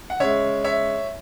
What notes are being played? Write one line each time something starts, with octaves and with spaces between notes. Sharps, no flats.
F#5
C#3 G#3 C#5 E5
C#5 E5